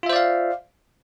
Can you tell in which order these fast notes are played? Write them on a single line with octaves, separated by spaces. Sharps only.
F4 E5 C5 D5 F5